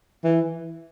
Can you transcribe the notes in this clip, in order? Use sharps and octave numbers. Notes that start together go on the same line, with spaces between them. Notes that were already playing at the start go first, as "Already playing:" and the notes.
E3